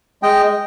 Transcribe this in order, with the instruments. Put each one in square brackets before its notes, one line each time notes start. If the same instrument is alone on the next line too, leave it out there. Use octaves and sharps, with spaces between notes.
[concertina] G#3 D#5 G5